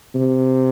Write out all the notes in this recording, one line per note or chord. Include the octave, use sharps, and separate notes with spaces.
C3